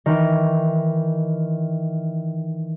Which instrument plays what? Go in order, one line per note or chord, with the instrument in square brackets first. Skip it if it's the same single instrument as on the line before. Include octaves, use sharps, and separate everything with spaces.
[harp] D#3 E3